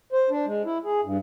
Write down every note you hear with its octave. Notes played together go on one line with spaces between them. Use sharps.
C5
D4
G#3
E4
G#4
G2